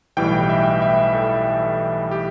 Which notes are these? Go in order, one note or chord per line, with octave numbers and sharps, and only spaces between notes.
B1 A2 E3 G3 G5
E5
E5
A4
G4